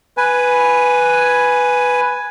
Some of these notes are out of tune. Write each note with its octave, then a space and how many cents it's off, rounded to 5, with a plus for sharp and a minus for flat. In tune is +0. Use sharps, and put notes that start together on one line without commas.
B4 +0 G#5 +0